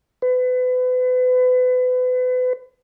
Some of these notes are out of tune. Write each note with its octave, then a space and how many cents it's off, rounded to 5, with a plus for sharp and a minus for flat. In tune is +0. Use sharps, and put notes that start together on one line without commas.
B4 +35